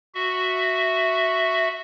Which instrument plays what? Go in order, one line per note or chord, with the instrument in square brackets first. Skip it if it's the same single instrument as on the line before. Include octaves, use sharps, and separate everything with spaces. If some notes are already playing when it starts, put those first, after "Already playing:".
[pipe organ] F#4 E5